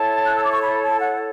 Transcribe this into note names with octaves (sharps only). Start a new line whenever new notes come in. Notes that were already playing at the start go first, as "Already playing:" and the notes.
Already playing: E4 A4 C#5 A5
F#6
E6
D6
C#6
B5
A5
F#5